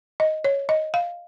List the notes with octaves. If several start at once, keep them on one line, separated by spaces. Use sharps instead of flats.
D#5
C#5
D#5
F5